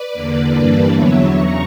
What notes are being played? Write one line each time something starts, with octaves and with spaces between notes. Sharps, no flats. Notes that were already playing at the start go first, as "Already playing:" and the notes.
Already playing: B4 D5
E2 D3 A#3
G2 E3 G3 A#3 D4 B4 D5
E2 D3 F#3 B3 C#5 E5
E2 C#3 A#5 C#6